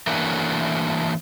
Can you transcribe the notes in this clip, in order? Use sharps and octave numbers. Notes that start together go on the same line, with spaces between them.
E3 A3 A#3 C#4 D4 F#4